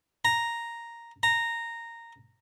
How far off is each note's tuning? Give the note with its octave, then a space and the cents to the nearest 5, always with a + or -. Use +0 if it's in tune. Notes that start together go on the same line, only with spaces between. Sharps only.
A#5 +0
A#5 -10